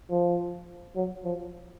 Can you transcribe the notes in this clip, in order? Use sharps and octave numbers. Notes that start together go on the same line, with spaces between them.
F3
F#3
F3